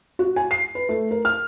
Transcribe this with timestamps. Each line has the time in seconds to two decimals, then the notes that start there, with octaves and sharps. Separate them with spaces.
0.19 F#4
0.36 G#5
0.51 C7
0.75 B4
0.89 A3
1.11 A#4
1.25 F6